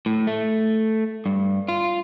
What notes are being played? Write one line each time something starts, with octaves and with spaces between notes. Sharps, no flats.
A2
A3
G2
F4